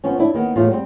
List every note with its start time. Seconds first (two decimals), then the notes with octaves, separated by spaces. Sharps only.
0.04 F3 B3 C#4
0.19 D4 E4
0.34 D#3 A#3 B3
0.56 E2 A2 A3 F4
0.69 G3 B3 C4